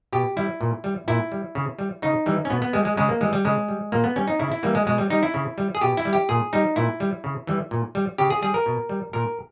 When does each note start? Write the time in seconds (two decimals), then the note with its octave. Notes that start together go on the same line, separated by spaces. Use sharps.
0.13 B2 G4
0.37 G3 E4
0.61 A#2
0.84 G3
1.08 A#2 E4
1.32 G3
1.55 C#3
1.79 G3
2.02 C#3 D#4
2.26 E3 G3
2.45 C#4
2.50 B2 B3
2.62 B3
2.73 G3 G#3
2.85 G#3
2.97 C#3 G#3
3.09 A#3
3.21 E3 G3 G#3
3.33 G3
3.45 C#3 G#3
3.68 G3
3.92 A#2 A#3
4.04 B3
4.16 G3 C#4
4.28 D#4
4.39 C#3 E4
4.52 E4
4.63 E3 G3 A#3
4.75 G#3
4.87 B2 G#3
4.98 G3
5.10 G3 D#4
5.23 E4
5.34 C#3
5.58 G3
5.75 G#4
5.81 B2 G4
5.97 E4
6.05 G3
6.13 G4
6.29 A#2 G#4
6.53 G3 D#4
6.76 A#2 E4
7.00 G3
7.24 C#3
7.47 E3 G3
7.71 A#2
7.95 G3
8.18 C#3 G4
8.30 G#4
8.42 G3 G#4
8.54 A#4
8.66 B2
8.89 G3
9.13 A#2 A#4